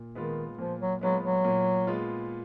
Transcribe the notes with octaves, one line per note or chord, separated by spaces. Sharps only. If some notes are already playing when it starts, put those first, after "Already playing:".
Already playing: A#2
D#3 G#3 B3 F4
A#2 F3
F#3
F#3 G#3 B3 F4
F#3
A#2
G#3 B3 F4